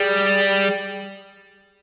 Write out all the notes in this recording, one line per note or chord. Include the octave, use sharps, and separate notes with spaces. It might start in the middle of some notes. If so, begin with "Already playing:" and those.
Already playing: G3 G#4